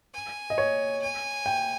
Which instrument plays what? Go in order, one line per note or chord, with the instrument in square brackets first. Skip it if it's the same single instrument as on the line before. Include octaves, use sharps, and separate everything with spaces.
[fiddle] G#5
[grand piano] D#5
C#5
[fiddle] G#5
[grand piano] G5